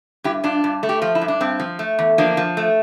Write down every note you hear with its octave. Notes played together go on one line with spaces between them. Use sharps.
G2 E4 G4
G2 D4 F4
G2
A3
G4
F3 F4
E4
G2
D4
G2 C4
F3
A3
E2
F3 A#3 D4
F3
A3